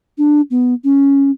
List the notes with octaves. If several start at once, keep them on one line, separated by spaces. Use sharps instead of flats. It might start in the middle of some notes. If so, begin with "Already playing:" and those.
D4
B3
C#4